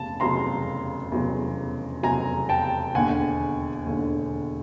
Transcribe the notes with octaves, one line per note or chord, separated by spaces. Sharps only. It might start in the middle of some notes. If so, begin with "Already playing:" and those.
Already playing: F1 E2 C#3 A5
F1 E2 C#3 F#3 A#5 C6
F1 E2 C#3 F#3
F1 E2 C#3 F#3 G#5 A#5
G5 A5
E1 D#2 D3 F#5 G#5
E1 D#2 D3